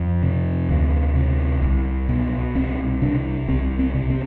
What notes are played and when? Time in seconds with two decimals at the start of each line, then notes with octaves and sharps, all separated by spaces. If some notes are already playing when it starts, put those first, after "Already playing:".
Already playing: F2
0.23 C3
0.69 D2
1.16 C3
1.62 C2
2.09 B2
2.55 C2 C4
3.02 C3 D4
3.48 C2 C4
3.79 C4
3.94 C3
4.10 C4